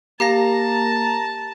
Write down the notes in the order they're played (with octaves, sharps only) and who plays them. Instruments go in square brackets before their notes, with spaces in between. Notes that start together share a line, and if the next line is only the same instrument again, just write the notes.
[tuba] A#3 [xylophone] G4 F5 A#6 [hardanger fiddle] A5 [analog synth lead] A#5